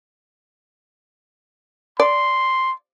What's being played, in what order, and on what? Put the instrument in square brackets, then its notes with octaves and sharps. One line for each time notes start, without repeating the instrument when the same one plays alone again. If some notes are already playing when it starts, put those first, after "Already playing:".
[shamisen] D5 [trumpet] C6